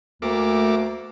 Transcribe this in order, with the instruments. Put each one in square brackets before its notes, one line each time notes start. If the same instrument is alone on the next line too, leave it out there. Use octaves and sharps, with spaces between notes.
[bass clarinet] D2 [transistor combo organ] A3 A#3 D6